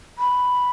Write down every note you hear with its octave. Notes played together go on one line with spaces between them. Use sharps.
B5